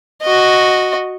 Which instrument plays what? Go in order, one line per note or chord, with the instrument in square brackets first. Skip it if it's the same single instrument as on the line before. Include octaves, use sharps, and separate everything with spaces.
[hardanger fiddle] F#4 D#5